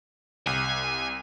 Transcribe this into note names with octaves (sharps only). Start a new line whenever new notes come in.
C2 G#5